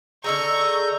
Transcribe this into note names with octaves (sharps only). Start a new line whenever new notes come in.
D3 D#4 G#4 A#5 C#6 E6 G6